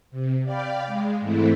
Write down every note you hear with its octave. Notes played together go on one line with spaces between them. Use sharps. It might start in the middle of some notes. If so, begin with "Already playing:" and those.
C3
D5 F5 G5 B5
G#3
G#2 E3 A3 C4 E4